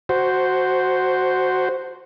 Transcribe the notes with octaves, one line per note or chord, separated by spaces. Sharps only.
F#4 C5